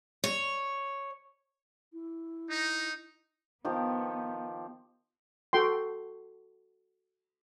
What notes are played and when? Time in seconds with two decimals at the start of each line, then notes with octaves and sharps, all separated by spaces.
0.24 C#5
1.93 E4
2.51 D#4
3.65 D#3 F3 B3 G4
5.53 F#4 A4 G5 C6